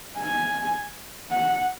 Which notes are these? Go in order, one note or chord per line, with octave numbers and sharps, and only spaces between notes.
G#5
F#5